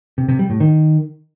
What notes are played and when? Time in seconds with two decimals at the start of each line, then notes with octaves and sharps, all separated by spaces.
0.18 C3
0.29 C3
0.39 G3
0.50 A2
0.60 D#3